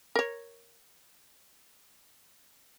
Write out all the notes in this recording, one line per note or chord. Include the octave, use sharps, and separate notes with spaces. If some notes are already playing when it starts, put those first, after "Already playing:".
A#4 C#5